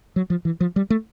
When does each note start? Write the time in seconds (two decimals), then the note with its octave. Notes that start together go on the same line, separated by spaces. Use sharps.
0.16 F#3
0.30 F3
0.45 E3
0.60 F3
0.76 G3
0.90 A3